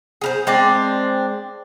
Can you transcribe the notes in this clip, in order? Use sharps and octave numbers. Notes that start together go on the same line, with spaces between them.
G#4 A#4 C5
G#3 C4 D4 D5